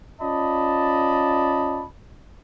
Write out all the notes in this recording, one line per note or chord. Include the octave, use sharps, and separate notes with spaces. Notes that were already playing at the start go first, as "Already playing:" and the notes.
C#4 F4 D5 D#5 A5 B5